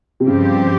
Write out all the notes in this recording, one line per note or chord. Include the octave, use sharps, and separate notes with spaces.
C3
G2 C#3 F3 C4 G4